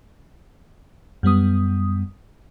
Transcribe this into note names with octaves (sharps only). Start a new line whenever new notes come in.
F#2 G3 B3 D#6